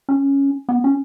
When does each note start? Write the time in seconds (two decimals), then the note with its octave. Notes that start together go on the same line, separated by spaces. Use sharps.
0.09 C#4
0.69 B3
0.84 C#4